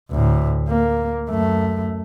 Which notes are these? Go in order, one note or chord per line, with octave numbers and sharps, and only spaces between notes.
D2 A2
A#3
F#2 A3